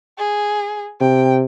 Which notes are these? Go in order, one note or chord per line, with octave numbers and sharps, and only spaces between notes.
G#4
C3 G5